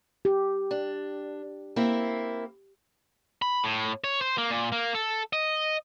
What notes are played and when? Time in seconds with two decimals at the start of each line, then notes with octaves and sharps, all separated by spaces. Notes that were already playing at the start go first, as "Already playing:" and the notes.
0.25 G4
0.71 D4
1.76 A#3 C4 E4
3.42 B5
3.64 A2
4.04 C#5
4.21 C5
4.38 A#3
4.50 A#2
4.72 A#3
4.95 A4
5.33 D#5